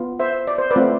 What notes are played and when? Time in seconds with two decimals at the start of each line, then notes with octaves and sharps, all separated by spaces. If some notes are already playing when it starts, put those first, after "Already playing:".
Already playing: B3 F4
0.19 C5 E5
0.47 D5
0.58 C5
0.71 B4 D5
0.76 A3 C4 F4